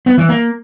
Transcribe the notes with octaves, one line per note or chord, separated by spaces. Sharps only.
B3
E3
A#3